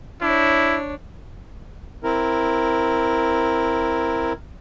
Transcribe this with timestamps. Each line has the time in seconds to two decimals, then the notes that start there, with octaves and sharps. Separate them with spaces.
0.21 D4 E4 C#5
2.04 C4 E4 A#4